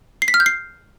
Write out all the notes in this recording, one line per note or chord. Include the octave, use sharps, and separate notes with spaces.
C7
B6
F6
G6
C7